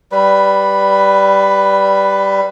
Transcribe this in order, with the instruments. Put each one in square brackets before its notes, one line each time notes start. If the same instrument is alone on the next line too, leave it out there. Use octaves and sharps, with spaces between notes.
[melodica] G3 B4